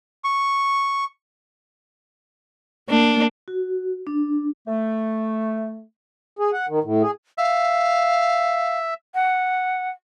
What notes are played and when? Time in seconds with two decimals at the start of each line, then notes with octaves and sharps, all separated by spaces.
0.24 C#6
2.89 A#3 D4
3.48 F#4
4.07 D4
4.67 A3
6.39 G#4
6.53 F#5
6.69 D#3
6.84 A2
7.02 G#4
7.38 E5 F5
9.15 F#5